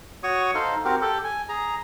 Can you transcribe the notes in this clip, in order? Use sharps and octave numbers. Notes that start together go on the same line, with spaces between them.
F#4 C#5 C#6 D#6
D#4 A4 C5 F5
C4 F#4 G4 A#4
G4 A4
G#5
G#4 A#5